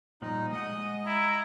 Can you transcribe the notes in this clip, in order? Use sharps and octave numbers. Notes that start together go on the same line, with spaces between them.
A#2 F3 G3 D#4
G#3 D#5 F#5 D#6
E4 A#5